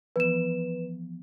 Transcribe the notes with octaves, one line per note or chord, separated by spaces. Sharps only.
E3 F3 B3 B4 E7